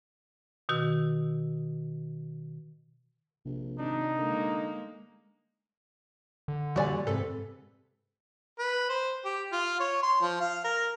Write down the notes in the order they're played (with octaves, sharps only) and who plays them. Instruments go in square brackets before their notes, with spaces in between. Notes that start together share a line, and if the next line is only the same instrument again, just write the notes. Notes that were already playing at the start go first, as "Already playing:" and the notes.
[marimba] B2 D#3 F#4 E6
[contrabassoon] A#1 [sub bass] C3
[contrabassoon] G#1 [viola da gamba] D4 [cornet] D#4
[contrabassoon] D3 [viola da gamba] G#3 A#3
[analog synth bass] D3
[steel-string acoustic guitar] A#2 G3 [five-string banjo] F#4 D5 G#5
[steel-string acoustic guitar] G#2 C3 B4 [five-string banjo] A4
[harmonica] B4
C5
G4
F4
C#5
C6
F3
F5
A#4